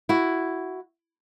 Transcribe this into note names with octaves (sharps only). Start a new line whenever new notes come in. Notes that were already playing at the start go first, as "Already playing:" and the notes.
E4 F#4